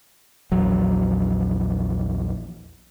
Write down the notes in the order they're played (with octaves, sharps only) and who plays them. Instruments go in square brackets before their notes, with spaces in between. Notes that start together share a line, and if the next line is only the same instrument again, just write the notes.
[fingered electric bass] A#1 E2 F#3